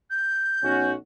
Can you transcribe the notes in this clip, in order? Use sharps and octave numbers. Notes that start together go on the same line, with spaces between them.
G6
B1 C#4 F#4